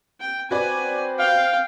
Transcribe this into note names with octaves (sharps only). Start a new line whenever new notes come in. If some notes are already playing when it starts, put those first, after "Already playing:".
G5
C4 F#4 B4 D5 G#5
F5 G5